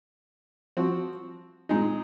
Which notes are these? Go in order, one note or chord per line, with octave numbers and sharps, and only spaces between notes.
F3 C4 F#4
A#2 G#3 D#4